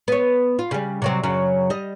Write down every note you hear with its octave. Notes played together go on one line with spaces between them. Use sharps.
B3 C#5
F4
C#3 G3
C3 F#3 C4
F#2 C#3 F#3
G3 D#5